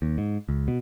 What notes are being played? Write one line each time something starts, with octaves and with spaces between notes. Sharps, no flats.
D#2
G#2
C#2
B2